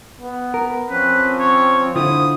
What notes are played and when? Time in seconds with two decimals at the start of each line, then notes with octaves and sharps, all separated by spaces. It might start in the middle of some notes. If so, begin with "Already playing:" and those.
0.21 B3
0.54 A#4
0.90 F3 C4 C#4 B4
1.40 C#5
1.96 D3 E4 F4 C5 D#6